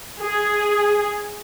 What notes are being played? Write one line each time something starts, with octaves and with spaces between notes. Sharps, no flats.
G#4